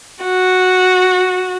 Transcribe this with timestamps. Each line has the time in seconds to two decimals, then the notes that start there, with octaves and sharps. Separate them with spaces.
0.24 F#4